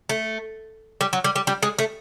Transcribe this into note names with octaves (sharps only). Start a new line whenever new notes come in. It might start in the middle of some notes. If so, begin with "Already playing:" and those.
A3
G3
F#3
G3
G3
G3
G#3
A3